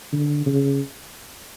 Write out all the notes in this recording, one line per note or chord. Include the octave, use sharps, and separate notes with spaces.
D3
C#3